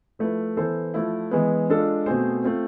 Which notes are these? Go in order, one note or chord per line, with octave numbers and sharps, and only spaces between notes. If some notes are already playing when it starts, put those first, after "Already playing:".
F3 A3 E4 B4
E3 B3 E4 A4 C5
F3 A3 E4
E3 G#3 B3
G#3 D4 F4 A4
B2 A3 C4 G#4 C5
A3 C4 F4